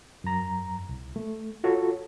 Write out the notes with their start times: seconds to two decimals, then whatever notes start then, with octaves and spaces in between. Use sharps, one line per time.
0.24 F#2 A#5
0.89 C2
1.16 A3
1.64 F4 F#4 A4 C#5